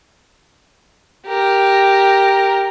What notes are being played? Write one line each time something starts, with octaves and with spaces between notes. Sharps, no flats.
G4 A#4